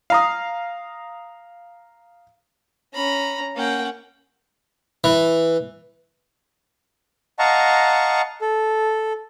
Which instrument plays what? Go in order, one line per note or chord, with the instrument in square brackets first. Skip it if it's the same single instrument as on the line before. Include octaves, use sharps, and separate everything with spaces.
[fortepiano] F5 A#5 D#6
[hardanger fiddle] C#4 A#5 [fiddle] B5
[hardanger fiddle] A#3 G5 [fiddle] C#4 F#5
[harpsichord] E3
[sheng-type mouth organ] D#5 F5 F#5 A5 A#5 C#6
A4